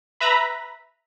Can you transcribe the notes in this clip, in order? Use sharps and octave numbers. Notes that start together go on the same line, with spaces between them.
B4 E5 A#5 B5